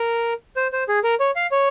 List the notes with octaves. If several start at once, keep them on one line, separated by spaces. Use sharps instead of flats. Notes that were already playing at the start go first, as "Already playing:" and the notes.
Already playing: A#4
C5
C5
G#4
A#4
C#5
F5
C#5